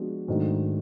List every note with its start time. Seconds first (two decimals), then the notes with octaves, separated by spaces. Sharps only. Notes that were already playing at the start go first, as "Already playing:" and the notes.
Already playing: F3 G#3 B3 D4 F#4
0.28 G#2 D#3 F#3 A3 D4